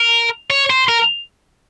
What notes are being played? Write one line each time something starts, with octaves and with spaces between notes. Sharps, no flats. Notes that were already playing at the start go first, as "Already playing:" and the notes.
Already playing: A#4
C#5
C5
A#4